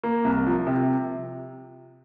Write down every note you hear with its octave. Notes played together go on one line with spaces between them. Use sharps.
A#3
C2
F3
C3